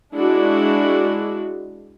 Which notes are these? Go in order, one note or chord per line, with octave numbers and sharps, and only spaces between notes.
G#3 D4 E4 F#4